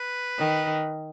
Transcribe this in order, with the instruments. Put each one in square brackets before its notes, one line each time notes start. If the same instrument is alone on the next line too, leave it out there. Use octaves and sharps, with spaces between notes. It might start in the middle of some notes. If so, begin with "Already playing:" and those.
Already playing: [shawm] B4
[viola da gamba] D#3